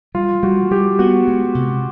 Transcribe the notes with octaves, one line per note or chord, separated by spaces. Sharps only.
G3 F4
G3 F#4
G3 G4
B3 F#4
G#3
C3